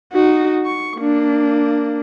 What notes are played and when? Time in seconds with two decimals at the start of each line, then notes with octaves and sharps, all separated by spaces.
0.13 D#4 F#4
0.66 C#6
0.99 A#3 D4